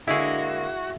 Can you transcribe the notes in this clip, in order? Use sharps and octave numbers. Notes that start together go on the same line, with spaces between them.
D3 G#3 A#3 E4 F#4 G#4 E5